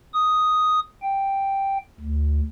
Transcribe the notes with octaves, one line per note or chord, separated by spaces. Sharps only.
D#6
G5
D2